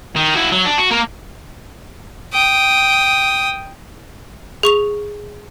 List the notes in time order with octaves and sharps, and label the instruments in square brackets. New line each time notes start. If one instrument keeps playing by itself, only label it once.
[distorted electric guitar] D#3
E4 F#4
F#3
D4
F#4
A#3 A#4
[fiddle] G5 D#6
[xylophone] G#4 C#6 F7